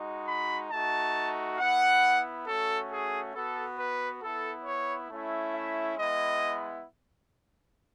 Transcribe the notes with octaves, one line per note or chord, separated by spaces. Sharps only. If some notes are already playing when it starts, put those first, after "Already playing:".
Already playing: G#3 D#4 F#4
B5
A3 D#4 F#4 A5
B3 E4 F#5
A3 C#4 F#4 A4
G#4
B3 F#4 A4
B4
B3 E4 A4
C#5
A3 C#4 E4
E5
G#3 B3 E4 D#5